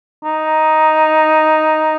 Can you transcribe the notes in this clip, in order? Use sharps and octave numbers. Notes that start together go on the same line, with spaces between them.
D#4